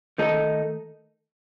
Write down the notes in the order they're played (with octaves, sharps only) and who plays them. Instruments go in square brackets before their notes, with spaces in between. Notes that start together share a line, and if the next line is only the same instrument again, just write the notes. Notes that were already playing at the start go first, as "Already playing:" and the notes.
[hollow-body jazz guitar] D#3 A3 D#4 A4